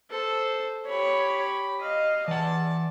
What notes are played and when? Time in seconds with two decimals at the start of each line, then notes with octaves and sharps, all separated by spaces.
0.10 A4 C5
0.87 G4 C#5 B5
1.81 D#5 F5
2.28 E3 D5 F#5 A5